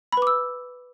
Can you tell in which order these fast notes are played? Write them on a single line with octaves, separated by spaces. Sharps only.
B5 B4 D6 E6